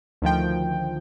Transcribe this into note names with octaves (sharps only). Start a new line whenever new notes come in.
D2 D#3 F3 G5